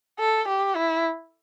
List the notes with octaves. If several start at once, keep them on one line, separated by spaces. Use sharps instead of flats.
A4
G4
E4